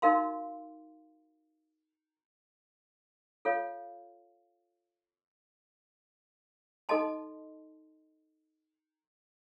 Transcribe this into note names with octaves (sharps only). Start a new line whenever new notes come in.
D#4 F#4 A#4 F5 C6
F4 A4 C#5 F5
D#4 A4 D#5 A5 C6